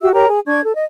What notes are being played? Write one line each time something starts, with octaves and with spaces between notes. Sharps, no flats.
F#4 G4 E5 E6
G4 A#4 C#5 A#5
G#4
D4 D5 C#6 G#6
A4
D#5